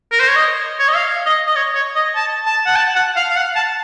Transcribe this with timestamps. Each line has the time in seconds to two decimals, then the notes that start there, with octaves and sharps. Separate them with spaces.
0.12 A#4
0.20 C5
0.28 C#5
0.36 D#5
0.80 C#5
0.88 D#5
0.95 F5
1.26 D#5
1.47 D#5
1.56 C#5
1.75 C#5
1.96 D#5
2.16 A5
2.46 A5
2.66 F#5
2.76 A5
2.95 F#5
3.16 F5
3.31 F5
3.36 F#5
3.56 A5